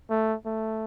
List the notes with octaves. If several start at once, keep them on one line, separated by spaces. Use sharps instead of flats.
A3
A3